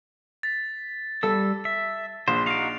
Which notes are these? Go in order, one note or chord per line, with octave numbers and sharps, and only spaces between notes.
A6 B6
G3 A4 E6
E5
A#1 C5
D#4 F#4 F5 D7 F7